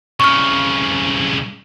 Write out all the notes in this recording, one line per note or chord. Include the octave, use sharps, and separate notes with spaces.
C2 C#3 C#6 F6